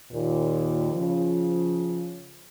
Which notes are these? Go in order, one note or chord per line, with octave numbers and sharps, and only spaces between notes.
D#2 A#2
C#3 F3